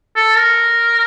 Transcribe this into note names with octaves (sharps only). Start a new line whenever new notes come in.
A4
A#4